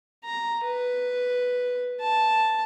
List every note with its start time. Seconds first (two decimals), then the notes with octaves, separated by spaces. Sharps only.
0.24 A#5
0.65 B4
2.01 A5